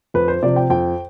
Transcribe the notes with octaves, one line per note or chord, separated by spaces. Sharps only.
F2 B4
C5
C3 F3 D5
G5
F2 G5